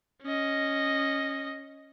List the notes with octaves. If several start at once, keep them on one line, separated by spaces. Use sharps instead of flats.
C#4 D#5